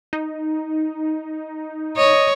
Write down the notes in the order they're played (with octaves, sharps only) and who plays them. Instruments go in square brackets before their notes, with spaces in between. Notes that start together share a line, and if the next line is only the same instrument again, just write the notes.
[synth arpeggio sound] D#4
[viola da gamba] C#5 [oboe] D#5